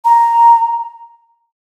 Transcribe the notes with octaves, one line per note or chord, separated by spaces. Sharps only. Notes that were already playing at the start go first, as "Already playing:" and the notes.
A#5